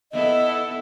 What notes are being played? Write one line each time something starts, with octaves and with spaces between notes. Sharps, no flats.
B3 E4 A4 D#5